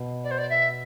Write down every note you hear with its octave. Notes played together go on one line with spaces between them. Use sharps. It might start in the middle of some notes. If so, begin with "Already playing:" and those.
Already playing: B2
D5
C5
D5
E5